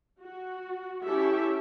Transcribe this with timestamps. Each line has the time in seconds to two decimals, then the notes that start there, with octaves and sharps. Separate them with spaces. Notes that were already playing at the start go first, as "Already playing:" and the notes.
0.22 F#4
1.05 C#4 E4 G4 A4 E5